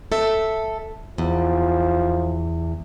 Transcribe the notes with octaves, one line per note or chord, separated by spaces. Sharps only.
A4 E5
E2 F3